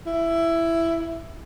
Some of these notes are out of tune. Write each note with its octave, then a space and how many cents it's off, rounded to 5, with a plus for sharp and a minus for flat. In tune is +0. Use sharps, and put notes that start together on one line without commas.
E4 +10